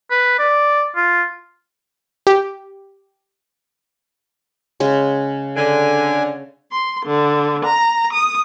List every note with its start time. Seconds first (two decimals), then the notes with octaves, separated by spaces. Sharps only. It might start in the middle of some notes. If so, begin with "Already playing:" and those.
0.11 B4
0.39 D5
0.96 F4
2.27 G4
4.80 C#3 G#3
5.56 D3 G#5
6.71 C6
7.05 D3
7.65 A#5
8.12 D#6